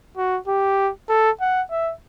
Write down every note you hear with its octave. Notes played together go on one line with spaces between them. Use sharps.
F#4
G4
A4
F#5
E5